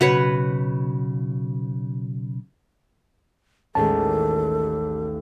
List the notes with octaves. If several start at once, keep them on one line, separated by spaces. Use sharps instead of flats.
B1 F#2 C#3 F#4 B4 C#5
A1 D#2 G#3 C#4 A4 A5